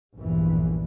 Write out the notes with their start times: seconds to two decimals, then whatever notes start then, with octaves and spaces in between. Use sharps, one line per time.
0.16 A#1 E2 G2 E3